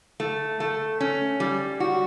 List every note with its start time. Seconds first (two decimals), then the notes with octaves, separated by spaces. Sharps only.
0.20 A3
0.60 A3
1.01 C#4
1.40 G3
1.80 F#4